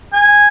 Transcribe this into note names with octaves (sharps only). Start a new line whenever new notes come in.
G#5